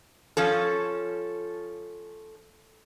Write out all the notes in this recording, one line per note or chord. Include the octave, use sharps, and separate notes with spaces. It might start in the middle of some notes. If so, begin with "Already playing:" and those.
F3 C#4 A4